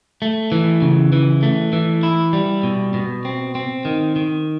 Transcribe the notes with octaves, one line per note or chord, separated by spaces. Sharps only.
A3
E3
C#3
E3
A3
E3
E4
G3
B2
B2
C4
C4
D#3
D#3